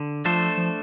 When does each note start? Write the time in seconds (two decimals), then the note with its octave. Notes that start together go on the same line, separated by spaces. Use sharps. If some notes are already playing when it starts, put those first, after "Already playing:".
Already playing: D3
0.25 F3 A3 D4 A4 C5
0.58 F3